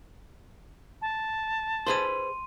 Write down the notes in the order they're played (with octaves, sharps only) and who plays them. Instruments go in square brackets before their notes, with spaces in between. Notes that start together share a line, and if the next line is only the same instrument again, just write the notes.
[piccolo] A5
[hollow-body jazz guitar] G#4 B4 C5 [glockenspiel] C6 D#7